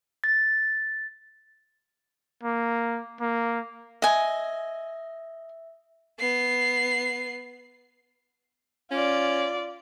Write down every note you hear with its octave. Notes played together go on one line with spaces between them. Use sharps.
A6
A#3
A#3
D#5 E5 G#5
B3 C7
C#4 F4 D5